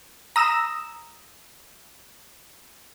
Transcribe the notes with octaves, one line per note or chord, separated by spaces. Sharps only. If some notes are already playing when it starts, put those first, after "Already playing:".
A#5 D#6 E6 A#6 E7